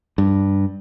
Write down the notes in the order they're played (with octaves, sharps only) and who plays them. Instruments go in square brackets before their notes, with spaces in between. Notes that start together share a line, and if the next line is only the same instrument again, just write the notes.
[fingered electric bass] G2